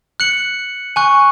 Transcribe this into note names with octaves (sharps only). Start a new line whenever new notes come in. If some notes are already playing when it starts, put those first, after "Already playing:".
F#6 C#7 F#7
G#5 C#6 F#6